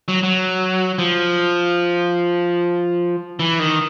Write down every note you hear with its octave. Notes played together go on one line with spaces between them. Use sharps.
F#3
F#3
F3
E3
D#3